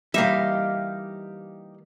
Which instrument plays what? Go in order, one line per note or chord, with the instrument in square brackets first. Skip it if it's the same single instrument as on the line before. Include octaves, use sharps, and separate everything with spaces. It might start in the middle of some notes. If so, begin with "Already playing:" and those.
[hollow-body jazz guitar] E3 G3 A#3 [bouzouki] D#4 G4 F5 [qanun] E5